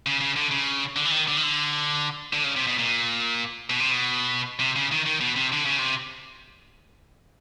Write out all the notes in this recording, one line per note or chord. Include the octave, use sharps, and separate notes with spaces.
C#3
C#3
D3
C#3
D3
E3
D#3
D3
D#3
D3
D3
C#3
C3
B2
A#2
B2
C3
B2
C3
C#3
D#3
D#3
B2
C3
D3
C#3
C3